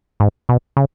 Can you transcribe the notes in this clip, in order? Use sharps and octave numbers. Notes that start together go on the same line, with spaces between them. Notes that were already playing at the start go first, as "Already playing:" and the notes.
G#2
B2
C#3